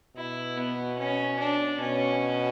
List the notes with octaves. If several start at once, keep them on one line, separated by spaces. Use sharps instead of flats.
B2 E4
B3
C#4
D4
B2 C#4